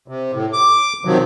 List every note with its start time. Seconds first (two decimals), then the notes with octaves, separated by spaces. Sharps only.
0.08 C3
0.32 A2
0.53 D6
1.05 C3 D#3 F3 F#3